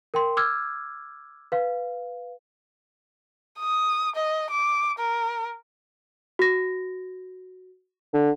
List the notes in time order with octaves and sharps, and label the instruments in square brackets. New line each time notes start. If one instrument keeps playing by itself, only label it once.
[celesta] A#4 G5 C6
D6 E6 F6 G#6
B4 F5
[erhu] D#6
D#5
D6
A#4
[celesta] F#4 A#6
[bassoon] D3